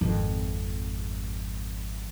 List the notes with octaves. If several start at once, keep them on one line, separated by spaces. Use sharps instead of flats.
G#1 F2